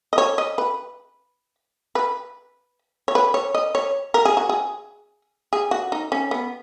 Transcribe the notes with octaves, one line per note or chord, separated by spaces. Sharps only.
D#5
C#5
D#5
B4
B4
C#5
B4
C#5
D#5
C#5
A#4
G#4
F#4
G#4
G#4
F#4
D#4
C#4
B3